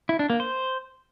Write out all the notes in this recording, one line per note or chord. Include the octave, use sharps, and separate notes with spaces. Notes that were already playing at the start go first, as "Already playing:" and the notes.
E4
D4
A#3
C5